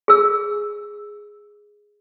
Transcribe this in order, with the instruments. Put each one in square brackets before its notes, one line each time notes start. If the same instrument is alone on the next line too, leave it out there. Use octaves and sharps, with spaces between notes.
[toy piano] G#4 E6